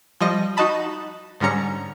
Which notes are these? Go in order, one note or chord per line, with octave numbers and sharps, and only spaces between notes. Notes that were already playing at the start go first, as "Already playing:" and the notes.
F3 G3 D#5 A#6
D#4 F#4 D#5 A5 B5
G#2 D3 G3 C#4 A#5 C#7